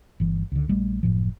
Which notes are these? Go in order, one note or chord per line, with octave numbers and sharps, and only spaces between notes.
G1 E3
C#2 D3
A#1 G3 A3
F#1 A2 F3